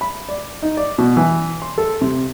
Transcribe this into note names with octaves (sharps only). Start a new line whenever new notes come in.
B5
D5
D#4
D5
B2
E3
C6
A4
C3